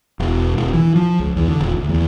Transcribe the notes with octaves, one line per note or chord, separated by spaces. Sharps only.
E1
E1
E3
F3
C#2
E2
D3
D#1
D2
E2